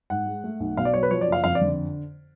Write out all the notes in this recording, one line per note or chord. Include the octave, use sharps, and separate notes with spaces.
G#2 F#5
G#3
A3
B1
B2 F5
D5
F#3 C#5
B4
F3 C#5
D5
F#1
F5
F2 F5
D5
D3